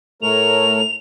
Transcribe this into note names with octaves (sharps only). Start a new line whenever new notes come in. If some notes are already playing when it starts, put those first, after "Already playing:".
A2 A3 A#4 C#5 F7